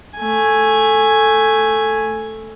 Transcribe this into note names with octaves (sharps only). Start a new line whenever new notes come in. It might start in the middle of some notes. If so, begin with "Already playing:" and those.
A3 G#5